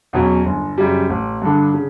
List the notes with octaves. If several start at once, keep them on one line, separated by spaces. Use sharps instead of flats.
E2 B2 F#3 C#4
G1
F#2 C#3 G3
A1
G2 D3
C#3